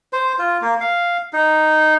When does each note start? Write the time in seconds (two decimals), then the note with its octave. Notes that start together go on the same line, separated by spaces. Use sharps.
0.13 C5
0.39 F4
0.61 A#3
0.80 F5
1.33 D#4